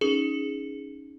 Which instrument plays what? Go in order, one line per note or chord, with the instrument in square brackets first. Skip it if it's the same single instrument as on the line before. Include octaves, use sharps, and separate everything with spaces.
[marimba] C#4 D#4 [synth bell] G#4